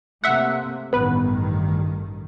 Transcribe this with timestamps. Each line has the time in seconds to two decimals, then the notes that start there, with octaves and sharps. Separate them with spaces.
0.24 C3 A3 A#3 E5 F#5
0.93 A1 G2 D#3 B3 B4